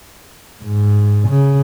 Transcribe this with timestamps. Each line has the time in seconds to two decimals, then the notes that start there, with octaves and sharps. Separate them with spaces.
0.63 G#2
1.28 C#3